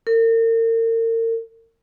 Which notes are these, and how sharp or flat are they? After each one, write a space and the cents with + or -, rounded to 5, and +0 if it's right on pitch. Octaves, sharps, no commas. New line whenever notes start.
A#4 -40